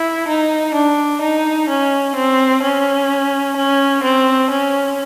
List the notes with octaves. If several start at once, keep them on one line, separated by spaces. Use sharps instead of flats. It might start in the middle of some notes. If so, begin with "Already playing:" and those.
Already playing: E4
D#4
D4
D#4
C#4
C4
C#4
C#4
C4
C#4